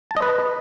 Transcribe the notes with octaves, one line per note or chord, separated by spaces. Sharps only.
A5
D#5
B4